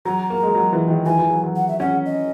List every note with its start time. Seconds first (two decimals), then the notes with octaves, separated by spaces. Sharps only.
0.05 F#3 A#5
0.30 A#3
0.43 G#3
0.55 F#3
0.73 E3
0.88 D#3
1.06 E3 G#5
1.18 E3
1.30 F#3
1.44 F#3
1.56 F#5
1.68 E5
1.80 C#4 F#5
2.06 D#5